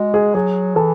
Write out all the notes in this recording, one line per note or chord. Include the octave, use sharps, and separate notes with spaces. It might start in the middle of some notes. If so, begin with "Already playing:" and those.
Already playing: G#3 F#4
G#4
F#3 G#4
E3 A4